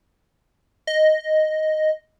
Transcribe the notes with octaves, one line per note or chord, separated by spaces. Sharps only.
D#5